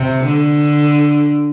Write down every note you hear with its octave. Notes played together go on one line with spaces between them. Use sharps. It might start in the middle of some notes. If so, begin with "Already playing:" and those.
Already playing: C3
D3